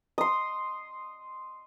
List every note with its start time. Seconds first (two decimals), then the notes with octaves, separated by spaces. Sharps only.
0.18 C6 D#6